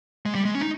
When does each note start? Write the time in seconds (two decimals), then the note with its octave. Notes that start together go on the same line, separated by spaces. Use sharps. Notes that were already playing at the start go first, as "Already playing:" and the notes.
0.26 G#3
0.35 G3
0.45 G#3
0.55 C#4
0.62 D#4